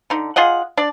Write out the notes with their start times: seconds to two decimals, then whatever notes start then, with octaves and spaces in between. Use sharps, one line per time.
0.10 D3 D#4
0.36 F4 G#4 D#5 F#5
0.77 D4 D5